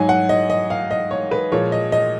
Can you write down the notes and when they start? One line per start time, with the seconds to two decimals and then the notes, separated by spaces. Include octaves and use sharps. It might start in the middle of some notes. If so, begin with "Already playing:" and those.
Already playing: G#2 F#3 G#5
0.09 F#5
0.29 D#5
0.50 D#5
0.70 F5
0.91 D#5
1.11 C#5
1.31 B4
1.52 A#2 F3 G#3 C#5
1.72 D#5
1.92 D#5